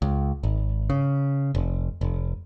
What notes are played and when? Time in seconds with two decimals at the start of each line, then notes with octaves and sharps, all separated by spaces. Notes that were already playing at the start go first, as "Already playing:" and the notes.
0.02 C#2
0.43 G#1
0.90 C#3
1.55 F1
2.01 F1